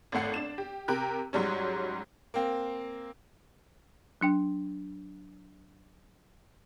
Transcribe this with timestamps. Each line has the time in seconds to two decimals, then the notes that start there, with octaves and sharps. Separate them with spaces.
0.12 G#1 A2 A3 F#5 C7
0.34 D4 E7
0.58 G4
0.88 C3 G4 A#4 F#6
1.33 G#2 F#3 G3 C#4
2.34 A#3 C4
4.21 F#3 D4 G5